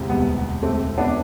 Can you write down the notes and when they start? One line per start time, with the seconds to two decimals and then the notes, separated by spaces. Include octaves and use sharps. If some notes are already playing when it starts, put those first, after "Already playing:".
Already playing: E1 D2 C3
0.09 G3 B3
0.63 A3 C4
0.98 B3 D4